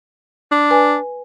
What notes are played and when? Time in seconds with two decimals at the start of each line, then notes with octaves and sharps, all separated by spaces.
0.52 D4
0.71 B4 G#5